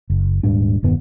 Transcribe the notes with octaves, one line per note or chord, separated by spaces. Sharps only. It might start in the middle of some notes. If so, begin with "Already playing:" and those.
F#1
D#1 G#2 G3 D4
E1 G2 D#3 B3